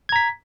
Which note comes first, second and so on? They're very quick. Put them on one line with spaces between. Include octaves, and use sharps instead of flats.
G#6 A#5 B6